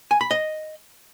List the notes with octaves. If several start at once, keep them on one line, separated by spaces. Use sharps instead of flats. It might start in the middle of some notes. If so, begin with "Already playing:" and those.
G#5
B5
D#5